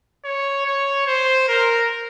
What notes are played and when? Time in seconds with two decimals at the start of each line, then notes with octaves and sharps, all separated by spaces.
0.25 C#5
0.65 C#5
1.07 C5
1.48 A#4